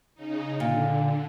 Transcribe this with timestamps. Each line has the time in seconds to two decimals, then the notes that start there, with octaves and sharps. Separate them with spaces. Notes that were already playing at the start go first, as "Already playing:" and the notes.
0.15 C#3 D#4
0.60 A#2 D3